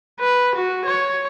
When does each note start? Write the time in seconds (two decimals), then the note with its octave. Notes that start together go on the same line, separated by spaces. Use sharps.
0.20 B4
0.55 F#4
0.86 C#5